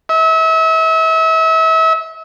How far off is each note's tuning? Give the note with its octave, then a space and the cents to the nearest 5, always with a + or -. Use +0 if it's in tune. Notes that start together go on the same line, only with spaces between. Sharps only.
E5 -35